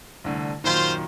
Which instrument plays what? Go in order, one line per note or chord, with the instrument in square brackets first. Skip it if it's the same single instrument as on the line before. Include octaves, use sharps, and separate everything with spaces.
[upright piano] C2 D3 A3
[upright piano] F#2 A#2 D#3 [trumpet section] F4 C5